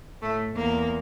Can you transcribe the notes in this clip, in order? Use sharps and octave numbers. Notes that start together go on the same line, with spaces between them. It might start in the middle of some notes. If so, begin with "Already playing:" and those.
A2 A3
E2 A#3